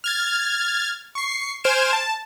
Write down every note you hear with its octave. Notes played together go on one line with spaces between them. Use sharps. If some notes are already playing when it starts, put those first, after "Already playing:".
F6 G#6 A6
C#6 C7
C5 G#5 F6 G#6 D7 E7
A5